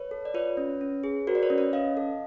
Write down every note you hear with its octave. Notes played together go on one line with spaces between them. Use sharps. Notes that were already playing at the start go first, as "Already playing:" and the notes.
Already playing: B4 C#5
A4
D5
F4 B4 C#5
C#4
C#4
G#4
F#4 A#4 C5
D5
B4 C#5
C#4
B4 C#5
C#4 D#5 F5
A4